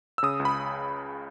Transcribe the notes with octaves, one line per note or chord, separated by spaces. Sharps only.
E6
C#3 D#6
C#2
B5